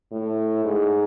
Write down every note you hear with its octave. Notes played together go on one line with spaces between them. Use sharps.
A2
G#2